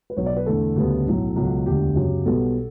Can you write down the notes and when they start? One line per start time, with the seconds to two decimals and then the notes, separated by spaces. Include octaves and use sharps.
0.10 B4
0.16 B1 B2 F#3 B3 C#5
0.26 D5
0.36 B4
0.46 E2 D3 A3 A4
0.76 D2 C#3 G3 B3
1.06 B1 A2 F#3
1.36 C#2 B2 F#3
1.66 E1 D2 D3 G4
1.96 F#2 C#3 F#3
2.26 B1 B2 G3 B3 A4